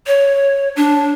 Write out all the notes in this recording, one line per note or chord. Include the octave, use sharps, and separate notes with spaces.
C#5
D4